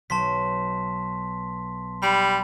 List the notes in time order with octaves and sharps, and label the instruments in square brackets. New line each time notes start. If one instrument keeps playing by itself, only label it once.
[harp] B1 [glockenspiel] A5 C6 B6
[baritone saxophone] G3 [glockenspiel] B5